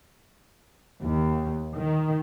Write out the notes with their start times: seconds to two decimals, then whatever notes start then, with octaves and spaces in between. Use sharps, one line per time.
1.03 D#2
1.76 D#3